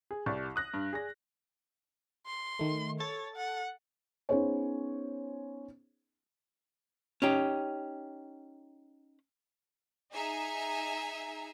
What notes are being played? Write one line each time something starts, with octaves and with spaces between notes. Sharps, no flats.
G#4
C2 G4 D5 C#6
D#6 F#6 A#6
G2
G#4 D5 A#6
C6
D#3 A3
A4 C#5 A6
F#5
B3 C#4 D#4 G#4 C5 C#5
C#4 D#4 G4
D#4 G#4 E5 G#5 A#5